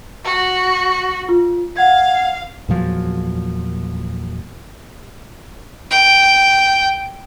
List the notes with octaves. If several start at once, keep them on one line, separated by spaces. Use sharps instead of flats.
F#4
F4
F5 F#5 G#6
E2 A#2 F3 F#3
G5